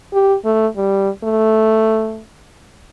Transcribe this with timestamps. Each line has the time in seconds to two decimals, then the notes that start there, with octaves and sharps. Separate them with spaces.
0.13 G4
0.45 A3
0.76 G3
1.24 A3